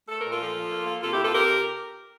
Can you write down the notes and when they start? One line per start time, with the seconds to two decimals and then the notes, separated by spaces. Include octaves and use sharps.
0.09 A3 A4
0.20 A#2 A#4
0.32 F4 A4
0.41 F3
0.56 F3
0.71 A#3
0.87 A#3
1.02 C3 F4 A4
1.13 E4 G4
1.18 C3
1.23 F4 A4
1.33 C3 G4 A#4